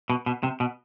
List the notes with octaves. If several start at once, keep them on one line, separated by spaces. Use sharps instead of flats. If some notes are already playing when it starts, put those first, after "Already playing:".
B2
B2
C3
B2